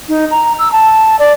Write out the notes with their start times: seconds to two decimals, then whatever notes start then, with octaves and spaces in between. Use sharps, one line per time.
0.09 D#4
0.31 A#5
0.59 E6
0.72 A5
1.19 D5